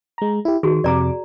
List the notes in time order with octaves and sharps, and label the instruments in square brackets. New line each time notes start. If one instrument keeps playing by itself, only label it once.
[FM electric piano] G#3 A#5
E4 G4
[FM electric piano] D#3 [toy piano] F#4 G#4
[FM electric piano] F2 C3 D6 [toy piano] D5 A#5